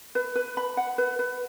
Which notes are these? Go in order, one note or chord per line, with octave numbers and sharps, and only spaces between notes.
B4
B4
B5
F#5
B4
B4